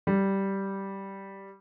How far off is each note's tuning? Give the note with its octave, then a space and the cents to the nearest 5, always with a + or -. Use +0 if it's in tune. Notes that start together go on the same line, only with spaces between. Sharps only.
G3 -10